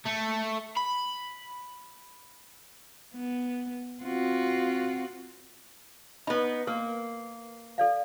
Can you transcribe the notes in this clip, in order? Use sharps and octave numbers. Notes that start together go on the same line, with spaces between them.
A3
B5
B3
C4 F4 F#4
B3 D#4 B5
A#3 A#4
A4 D5 F5